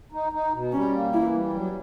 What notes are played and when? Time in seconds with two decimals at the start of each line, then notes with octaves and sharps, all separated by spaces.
0.12 D#4
0.32 D#4
0.53 B2
0.73 G3 C#4
0.93 A#3
1.13 E3 E4
1.33 G3
1.54 F#3